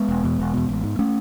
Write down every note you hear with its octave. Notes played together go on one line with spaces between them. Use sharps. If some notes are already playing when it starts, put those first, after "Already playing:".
Already playing: G#3 B3
E1
E2 B2
E1
E2 B2
A1
G#2
A3 C#4